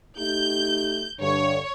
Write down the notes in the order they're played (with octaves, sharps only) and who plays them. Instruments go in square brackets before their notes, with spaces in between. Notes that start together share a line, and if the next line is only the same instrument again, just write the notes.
[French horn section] A3 D#4 G4 [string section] G6
[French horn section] G2 D3 [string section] C#5